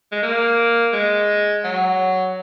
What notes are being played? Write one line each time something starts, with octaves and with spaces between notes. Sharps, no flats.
G#3
A#3
G#3
F#3